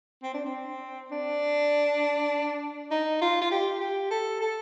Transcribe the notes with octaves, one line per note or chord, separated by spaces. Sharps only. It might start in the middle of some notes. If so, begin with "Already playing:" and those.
C4
D4
C4
D4
D#4
F4
F4
G4
G4
A4
A4